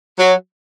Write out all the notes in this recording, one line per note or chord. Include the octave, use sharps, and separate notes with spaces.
F#3